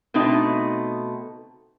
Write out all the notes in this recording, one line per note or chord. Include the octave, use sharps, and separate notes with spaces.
B2 A3 C4 D#4 D#5